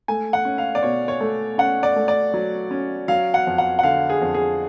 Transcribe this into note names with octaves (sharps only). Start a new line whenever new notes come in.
A3 G#5
F#5
C#4
F5
D5
B2 C#5
C#5
A3
C#4 F#5
D5
A3
D5
F#3
C#4
F#3 F5
F#5
F2
F#5
F#5
D3 F5
G#4
F2
G#4